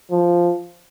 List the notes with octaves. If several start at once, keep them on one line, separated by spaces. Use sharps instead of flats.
F3